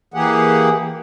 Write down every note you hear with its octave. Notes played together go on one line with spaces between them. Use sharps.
E3 A#3 G4 G#4 F#5